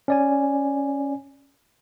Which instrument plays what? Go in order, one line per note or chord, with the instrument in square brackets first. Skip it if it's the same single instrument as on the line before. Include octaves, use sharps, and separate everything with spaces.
[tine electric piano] C#4 D5 G#5